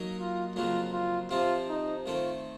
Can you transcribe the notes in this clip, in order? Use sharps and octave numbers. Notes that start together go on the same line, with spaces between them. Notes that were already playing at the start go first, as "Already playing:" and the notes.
Already playing: F#3 A#3 D#4 A#4
F4
F2 C#3 F#3 A#3 F4
F4
C3 F3 C4 F4
D#4
D#3 A3 C4 F4